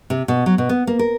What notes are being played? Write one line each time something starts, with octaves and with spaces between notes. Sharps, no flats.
C3
B2
F#3
B2
B3
A#3
A#4